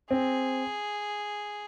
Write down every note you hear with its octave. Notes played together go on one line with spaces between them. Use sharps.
C4 G#4